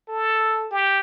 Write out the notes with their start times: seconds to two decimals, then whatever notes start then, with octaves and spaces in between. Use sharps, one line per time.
0.08 A4
0.71 G4